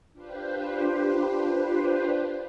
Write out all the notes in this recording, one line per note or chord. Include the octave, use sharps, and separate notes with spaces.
D4 F4 G4 B4 C5